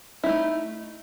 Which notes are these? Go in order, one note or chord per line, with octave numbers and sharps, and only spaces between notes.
A3 D#4 E4